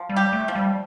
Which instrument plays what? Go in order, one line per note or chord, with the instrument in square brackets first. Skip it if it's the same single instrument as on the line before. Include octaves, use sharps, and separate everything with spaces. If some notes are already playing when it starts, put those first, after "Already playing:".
Already playing: [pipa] F3
[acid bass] G3
[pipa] G4
[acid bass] A3
[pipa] F3
[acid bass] G3